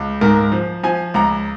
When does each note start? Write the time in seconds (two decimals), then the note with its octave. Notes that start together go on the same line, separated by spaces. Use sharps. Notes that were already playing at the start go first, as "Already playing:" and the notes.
Already playing: C#2
0.21 G#2 A#4
0.52 F3
0.83 F3 G#5
1.14 C#2 A#5